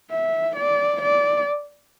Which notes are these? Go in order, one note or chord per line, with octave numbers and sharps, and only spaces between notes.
E5
D5
D5